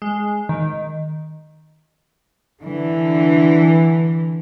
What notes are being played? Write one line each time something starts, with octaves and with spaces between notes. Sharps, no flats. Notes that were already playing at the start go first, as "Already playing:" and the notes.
G#3
D#3
D3 E3